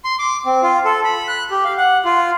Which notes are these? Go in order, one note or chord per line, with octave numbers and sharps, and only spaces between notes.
C6
D6
C4
F4
A4
B5
F#6
G4
F5
F#5
F4